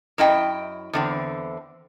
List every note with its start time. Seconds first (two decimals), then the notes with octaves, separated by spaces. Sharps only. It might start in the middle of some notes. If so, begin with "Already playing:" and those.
0.18 F#2 E4 D#5 G5
0.93 E2 D3 C4